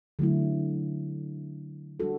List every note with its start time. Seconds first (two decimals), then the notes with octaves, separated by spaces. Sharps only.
0.19 D3 F#3 A3 E4
2.00 G3 D4 F#4 A4